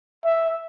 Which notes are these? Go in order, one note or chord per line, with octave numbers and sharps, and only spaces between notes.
E5